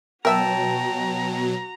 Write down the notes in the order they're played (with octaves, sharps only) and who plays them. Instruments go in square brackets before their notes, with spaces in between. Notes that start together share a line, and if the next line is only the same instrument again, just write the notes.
[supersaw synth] B2 F#3 [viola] F#4 A#5 [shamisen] A#4 E5 [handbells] G5 A5